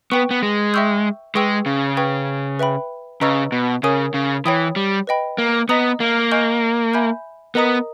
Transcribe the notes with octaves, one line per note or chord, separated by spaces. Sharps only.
B3 B4 G5 C#6
B3
G#3
E5 G5 C#6 E6 G6
G#3 G#4 B4 G5 C#6 E6
C#3
B4 G5 C#6
B4 E5 G5 B5
C#3 B4 D#5 A#5 C#6 E6
B2
C#3 A#4 C#5 G#5 D#6
C#3
E3 C#5 G5 B5 D#6
G3
B4 D#5 G5 B5
A#3
B3 D#5 A#5 D#6
A#3
D#5 G#5 C#6 G6
E5 G#5 B5 G6
B3 A#4 D#5 A#5 D#6